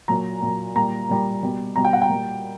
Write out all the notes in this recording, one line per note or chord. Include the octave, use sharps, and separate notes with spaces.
A#2 F#3 A#5
A#2 F#3
A#2 G3 A#5
A#2 G3
B2 G3
B2 G3 A#5
G5
F#5
G5
A#2 G3